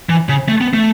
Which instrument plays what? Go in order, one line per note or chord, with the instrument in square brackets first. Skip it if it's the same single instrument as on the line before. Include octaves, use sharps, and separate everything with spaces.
[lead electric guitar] E3
C#3
A3
B3
A3